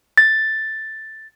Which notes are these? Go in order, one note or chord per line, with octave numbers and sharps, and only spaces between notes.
A6